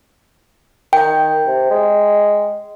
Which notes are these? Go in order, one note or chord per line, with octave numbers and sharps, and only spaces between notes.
D#3 G5
C3
G#3